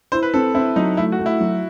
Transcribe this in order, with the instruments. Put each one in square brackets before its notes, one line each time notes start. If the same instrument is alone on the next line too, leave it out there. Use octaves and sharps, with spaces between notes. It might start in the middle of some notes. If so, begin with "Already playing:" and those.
[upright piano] E4 [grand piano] C5
[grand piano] B4
[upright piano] C4 [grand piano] A4
[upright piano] C4 [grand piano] E4
[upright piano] F#3 [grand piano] D#4
[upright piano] A3 [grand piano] E4
[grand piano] F#4
[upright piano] A3
[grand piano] E4
[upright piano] F#3